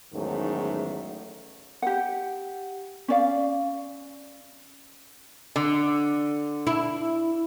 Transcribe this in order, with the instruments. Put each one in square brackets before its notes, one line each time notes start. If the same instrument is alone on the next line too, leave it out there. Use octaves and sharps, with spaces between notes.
[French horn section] E2 G#2 D#3 F#3 A3 C#4
[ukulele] G4 F#5
C#4 D5 F5
[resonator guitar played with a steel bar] D3
[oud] E4